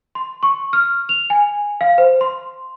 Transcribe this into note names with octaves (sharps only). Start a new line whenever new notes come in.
C6
C#6
F6
F7
G#5
F5
C5
C6